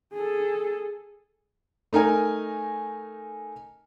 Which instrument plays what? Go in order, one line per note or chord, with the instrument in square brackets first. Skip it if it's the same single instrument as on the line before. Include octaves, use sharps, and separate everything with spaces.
[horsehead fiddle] G#4 A4
[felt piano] A3 D#4 A#4 G#5